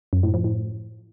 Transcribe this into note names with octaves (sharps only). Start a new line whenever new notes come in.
F#2
A2
F3
A2